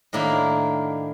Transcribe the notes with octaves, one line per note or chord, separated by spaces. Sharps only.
A2 D#3 A#3 D4 E4